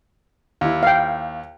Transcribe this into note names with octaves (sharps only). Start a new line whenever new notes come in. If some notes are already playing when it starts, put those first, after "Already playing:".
D#2 E4
F5 G5